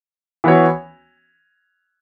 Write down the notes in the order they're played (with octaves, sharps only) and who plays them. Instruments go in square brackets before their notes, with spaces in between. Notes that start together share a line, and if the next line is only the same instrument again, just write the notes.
[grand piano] E3 B3 F#4 C#5